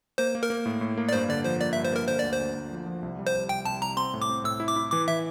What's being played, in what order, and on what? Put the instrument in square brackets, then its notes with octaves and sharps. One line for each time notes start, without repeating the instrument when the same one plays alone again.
[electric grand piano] A#3 [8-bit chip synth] C5
[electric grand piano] A#3
[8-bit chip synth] A#4
[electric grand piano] A#3
A2
A2
A#3
[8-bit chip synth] D5
[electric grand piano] G2 [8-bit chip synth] C5
[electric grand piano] D3 [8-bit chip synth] D5
[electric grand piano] F3 [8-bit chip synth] C5
[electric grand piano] A#3 [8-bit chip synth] D5
[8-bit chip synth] E5
[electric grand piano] G2
[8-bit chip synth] C5
[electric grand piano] A#3 [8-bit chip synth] A#4
[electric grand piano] D3 [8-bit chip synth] C5
[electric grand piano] D2 [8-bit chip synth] D5
[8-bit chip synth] C5
[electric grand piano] D2
D2
F3
F3
C2
G3
[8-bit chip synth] C5
[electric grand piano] C2
[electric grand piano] C2 [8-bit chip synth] G5
[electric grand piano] C2 [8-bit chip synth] A5
[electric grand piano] C2 [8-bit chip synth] A#5
[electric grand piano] C4 [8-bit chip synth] C6
[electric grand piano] A2
[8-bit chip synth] D6
[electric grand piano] C4
[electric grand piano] A2 [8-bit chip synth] E6
[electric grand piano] E4
[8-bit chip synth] D6
[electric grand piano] E4
[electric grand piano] E3 [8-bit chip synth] D6
[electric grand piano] E3 [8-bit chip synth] E5